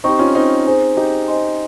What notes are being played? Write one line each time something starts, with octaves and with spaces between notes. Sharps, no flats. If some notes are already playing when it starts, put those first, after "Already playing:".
C4 D#4 G4 C5 G5 C#6
C#4 F4
C4 D#4
G#4 C5 D#5 G#5
D#4 G4
C5 D#5 G#5 C6